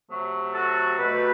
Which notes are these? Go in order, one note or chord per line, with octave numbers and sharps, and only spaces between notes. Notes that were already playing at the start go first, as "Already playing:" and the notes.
C3 F#3 A3
F#4 A4
B2 A3 G4 B4